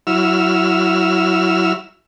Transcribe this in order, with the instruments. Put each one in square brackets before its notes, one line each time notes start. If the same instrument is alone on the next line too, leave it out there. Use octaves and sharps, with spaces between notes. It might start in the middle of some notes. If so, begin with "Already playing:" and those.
[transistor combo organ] F#3 E4 E6 F6